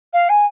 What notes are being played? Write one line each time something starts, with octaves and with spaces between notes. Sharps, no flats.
F5
G#5